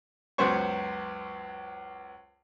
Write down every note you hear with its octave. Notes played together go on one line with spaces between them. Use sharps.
C#2 F#2 B3 C5 C#6